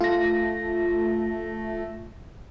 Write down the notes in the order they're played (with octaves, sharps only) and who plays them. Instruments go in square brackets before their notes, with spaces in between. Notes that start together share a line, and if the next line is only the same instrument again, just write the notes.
[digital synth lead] A3 [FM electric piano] F4 A#6